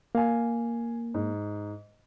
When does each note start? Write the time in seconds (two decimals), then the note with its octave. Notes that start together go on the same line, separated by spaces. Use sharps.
0.15 A#3 F5 G#5
1.14 G#2